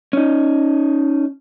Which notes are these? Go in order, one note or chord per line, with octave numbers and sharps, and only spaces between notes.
C#4 D#4